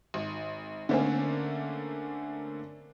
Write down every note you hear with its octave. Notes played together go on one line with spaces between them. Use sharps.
G#1
D3 A3 A#3 C4 C#4